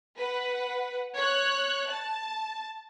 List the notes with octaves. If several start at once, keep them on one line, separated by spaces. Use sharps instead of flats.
B4 F#5
C#5 F#6
A5